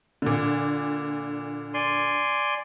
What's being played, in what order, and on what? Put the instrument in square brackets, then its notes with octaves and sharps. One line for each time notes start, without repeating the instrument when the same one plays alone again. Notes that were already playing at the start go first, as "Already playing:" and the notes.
[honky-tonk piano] A#2 D3
[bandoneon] D5 G#5 C6